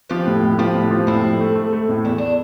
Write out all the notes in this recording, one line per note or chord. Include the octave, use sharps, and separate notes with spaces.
F3 G4 B4
A2
A2
F3 G4 B4
A2
F3
A2 C4 E4
A2
A3
A3
A3
A2
E2 E4
D4